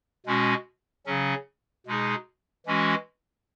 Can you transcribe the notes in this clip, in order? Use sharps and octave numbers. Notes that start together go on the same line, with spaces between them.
B2 G#3 C#4 F#4
C#3 F#3 C#4
B2 G#3 D#4 G#4
E3 G#3 C#4 F#4